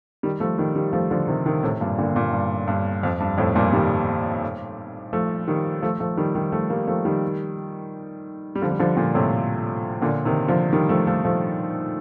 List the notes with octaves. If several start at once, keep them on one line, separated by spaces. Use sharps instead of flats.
D#3 G3
F3 A3
D#3 G3
D#3 G3
F3 A3
D3 F3
C3 D#3
C3 D#3
A2 C3
G2 A#2
A#2 D3
G2 A#2
G2
G2
F2
G2
F2 A2
G2 A#2
D#3 G3
F3 A3
D#3 G3
F3 A3
F3 A3
D#3 G3
D#3 G3
F3 A3
G3 A#3
F3 A3
D#3 G3
G3
D3 F3
G3
D3 F3
A#2 D3
A2 C3
A#2 D3
C3 D#3
D3 F3
D#3 G3
F3 A3
F3 A3
F3 A3